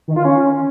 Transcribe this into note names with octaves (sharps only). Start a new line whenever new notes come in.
D#3
F4
C#4